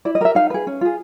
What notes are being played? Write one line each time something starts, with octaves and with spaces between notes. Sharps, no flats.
E4 D5
D#5
G4 A#4 E5
D#4 F5
G#4 B4
C#4
F4 G#4